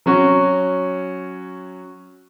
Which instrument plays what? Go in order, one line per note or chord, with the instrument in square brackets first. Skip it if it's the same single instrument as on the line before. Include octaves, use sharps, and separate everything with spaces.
[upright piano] F#3 C#4 F#4